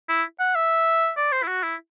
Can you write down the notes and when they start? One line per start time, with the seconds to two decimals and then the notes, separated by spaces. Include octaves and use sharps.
0.09 E4
0.40 F#5
0.55 E5
1.17 D5
1.32 C5
1.43 E4
1.47 F#4
1.63 E4